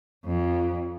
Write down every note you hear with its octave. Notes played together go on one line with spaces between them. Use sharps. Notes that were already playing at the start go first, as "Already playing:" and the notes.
F2